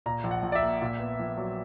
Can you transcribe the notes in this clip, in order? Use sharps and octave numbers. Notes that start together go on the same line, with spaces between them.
A#2 A#5
A#1
F#5
A#1
D5
E5
A#3
A#2
B3
A#1
F#3